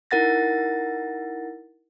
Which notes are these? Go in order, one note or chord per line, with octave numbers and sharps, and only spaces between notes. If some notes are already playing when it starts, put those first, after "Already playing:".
D#4 E4 A#4 F#5 A6 A#6